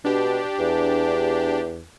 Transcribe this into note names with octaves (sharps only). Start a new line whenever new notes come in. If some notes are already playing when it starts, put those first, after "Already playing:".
B2 D4 G4
E2